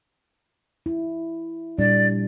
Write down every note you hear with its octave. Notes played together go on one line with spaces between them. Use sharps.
E4
A#2 G3 D4 D5